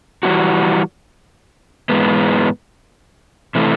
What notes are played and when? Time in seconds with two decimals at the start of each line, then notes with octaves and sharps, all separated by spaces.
0.23 E3 G3 B3 D#4 F#4
1.89 G#2 E3 G#3 B3
3.55 C3 E3 A3